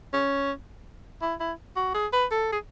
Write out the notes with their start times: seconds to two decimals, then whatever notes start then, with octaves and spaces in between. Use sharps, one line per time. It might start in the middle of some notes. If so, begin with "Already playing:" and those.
0.14 C#4
1.22 E4
1.40 E4
1.76 F#4
1.94 G#4
2.13 B4
2.31 A4
2.52 G#4